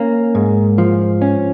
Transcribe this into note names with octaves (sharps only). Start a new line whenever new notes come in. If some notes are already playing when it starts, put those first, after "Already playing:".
Already playing: A#3 C#4
G#2
F3
C#4